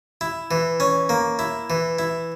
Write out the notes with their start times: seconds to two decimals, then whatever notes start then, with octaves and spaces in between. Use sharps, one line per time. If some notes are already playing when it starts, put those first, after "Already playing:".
0.21 E4
0.51 E3
0.80 C#4
1.09 A#3
1.39 E4
1.70 E3
1.99 E4